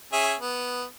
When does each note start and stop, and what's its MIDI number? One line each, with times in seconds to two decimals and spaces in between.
0.13 0.34 61
0.13 0.34 68
0.13 0.34 76
0.39 0.84 59